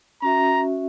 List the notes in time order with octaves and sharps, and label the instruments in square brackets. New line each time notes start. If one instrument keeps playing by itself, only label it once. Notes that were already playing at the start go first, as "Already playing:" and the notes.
[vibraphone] C#4 F#4 E5 [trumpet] A#5